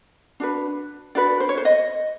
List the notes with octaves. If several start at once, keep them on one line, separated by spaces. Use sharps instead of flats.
D4 F#4 B4
D4 F#4 B4 D5
C5
C#5
C5
D#5